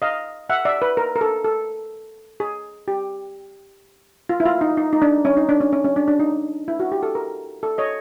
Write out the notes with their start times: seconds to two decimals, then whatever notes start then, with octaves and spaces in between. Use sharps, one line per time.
0.02 D#5 F5
0.49 E5 F#5
0.65 D5 E5
0.82 B4
0.97 A#4
1.16 A#4
1.21 A4
1.44 A4
2.40 G#4
2.88 G4
4.29 F4
4.40 E4
4.46 F4
4.61 D#4
4.77 D#4
4.93 D#4
5.02 D4
5.25 C#4
5.37 D#4
5.49 D4
5.61 C#4
5.73 C#4
5.85 C#4
5.96 D4
6.08 D4
6.19 D#4
6.68 E4
6.80 F#4
6.92 G4
7.03 A4
7.15 A#4
7.63 A4
7.78 C#5 D#5